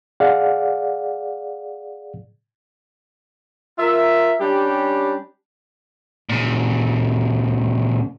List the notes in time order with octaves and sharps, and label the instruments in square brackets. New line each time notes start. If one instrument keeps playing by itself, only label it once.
[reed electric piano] G#4 D5 F5 F#5
[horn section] F4 A#4 E5
G3 C#4 D4 G4
[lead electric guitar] A#2 C#3